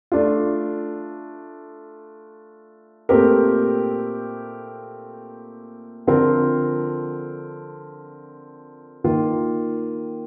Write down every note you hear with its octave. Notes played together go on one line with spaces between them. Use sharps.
A3 D4 F4
A#2 A3 C4 G4 A#4
D3 F3 C4 F4 A#4
D#3 A#3 F4